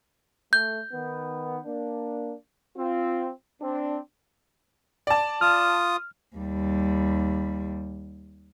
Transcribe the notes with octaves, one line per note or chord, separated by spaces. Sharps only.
A3 G6
D#3 B3
A#3 D4
C4 F4
C4 D4
D5 A5
F4 D#6 F6
D#2 G3